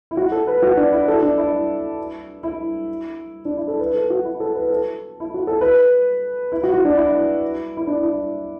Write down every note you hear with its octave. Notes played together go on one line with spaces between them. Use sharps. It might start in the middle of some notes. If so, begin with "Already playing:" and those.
E4
F#4
A4
B4
F#4
D4
E4
A4
D4
E4
E4
D4
E4
A4
B4
A4
F#4
E4
A4
B4
A4
E4
F#4
A4
B4
E4
F#4
F#4
D4
E4
E4
D4
E4